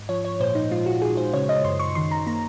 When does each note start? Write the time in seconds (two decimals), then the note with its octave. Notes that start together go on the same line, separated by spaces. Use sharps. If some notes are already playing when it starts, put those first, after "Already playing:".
Already playing: G#2
0.09 F3 C#5
0.25 C#5
0.40 A#2 C5
0.55 D#4
0.71 G#3 F4
0.86 F#4
1.02 G#3 G#4
1.17 C5
1.33 C#3 C#5
1.49 D#5
1.64 F#2 C6
1.79 C#6
1.95 D#3 C6
2.11 A#5
2.27 A#3 A#5